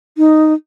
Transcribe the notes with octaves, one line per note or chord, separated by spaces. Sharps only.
D#4